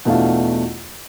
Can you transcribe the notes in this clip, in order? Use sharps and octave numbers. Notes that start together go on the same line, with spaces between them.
E2 B2 A3 D4 F4